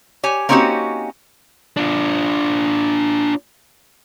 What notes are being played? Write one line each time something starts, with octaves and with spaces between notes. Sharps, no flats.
G4 C#5 G#5
A#3 C4 C#4 D#4 F#4 G4
D4 F4